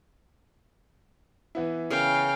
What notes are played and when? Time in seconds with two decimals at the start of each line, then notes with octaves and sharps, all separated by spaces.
1.55 E3 B3 E4
1.90 C#3 A#4 F5 G5